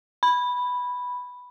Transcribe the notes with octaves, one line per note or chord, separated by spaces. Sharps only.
B5